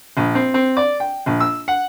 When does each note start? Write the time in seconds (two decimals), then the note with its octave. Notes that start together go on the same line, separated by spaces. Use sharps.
0.17 A#1
0.35 C4
0.54 C4
0.77 D5
1.00 G5
1.26 A#1
1.40 E6
1.68 F#5